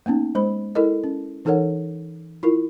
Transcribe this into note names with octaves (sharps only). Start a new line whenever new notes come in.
A#3 B3 C#4 D#4
G#3 C5 B5
E4 A4 A#4 D#5
C#4
E3 D#4 A4 A#4 C#5 F#5
E4 F4 A#4